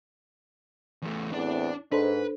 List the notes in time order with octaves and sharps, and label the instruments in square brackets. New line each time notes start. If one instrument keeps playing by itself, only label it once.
[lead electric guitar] E2 A3
[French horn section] E2 A2 C4 [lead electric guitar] D4 D5
[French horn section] G#2 [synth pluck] D4 A4 C5 [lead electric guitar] B4